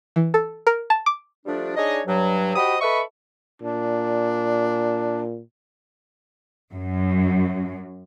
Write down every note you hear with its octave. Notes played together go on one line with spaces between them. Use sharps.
E3
A4
A#4
A5
D6
F3 G3 A3 D4
D4 D#4 G#4 C#5 D#5
G2 F#3
F#4 G4 C5 D#5 B5 D#6
A4 B4 D#5 E5 B5 C#6
A#2 D4
F#2